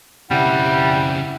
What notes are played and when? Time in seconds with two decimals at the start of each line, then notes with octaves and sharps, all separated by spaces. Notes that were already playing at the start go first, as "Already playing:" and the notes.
0.31 C#3 G3 C4 E4 F#5